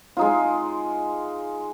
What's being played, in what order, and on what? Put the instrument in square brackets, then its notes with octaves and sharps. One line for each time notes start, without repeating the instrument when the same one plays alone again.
[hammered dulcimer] G#3 D#4 F4